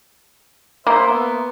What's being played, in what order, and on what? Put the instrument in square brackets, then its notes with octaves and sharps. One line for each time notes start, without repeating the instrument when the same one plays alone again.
[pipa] A#3 [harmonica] C5 E5
[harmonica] B3